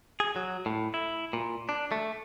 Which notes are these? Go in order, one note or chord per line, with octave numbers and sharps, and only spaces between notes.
G#4
F#3
A2
E4
A#2
D4
A3